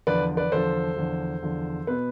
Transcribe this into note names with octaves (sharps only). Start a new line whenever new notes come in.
E2 D3 F3 B4 D5
B4 D5
E2 D3 F3 A4 C5
E2 D3 F3
E2 D3 F3
B2 B3 B4